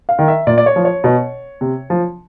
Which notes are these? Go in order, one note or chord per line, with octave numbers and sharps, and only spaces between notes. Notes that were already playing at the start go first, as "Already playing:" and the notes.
F5
D#3
E5
A#2 D5
D5
C#5
F3
C#5
B2
C3
F3